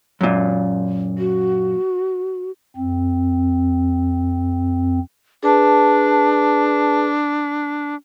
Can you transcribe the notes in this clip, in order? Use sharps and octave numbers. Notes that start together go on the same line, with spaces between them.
F#2 A#2
F#4
F2 C4
D4 G#4 B4 A5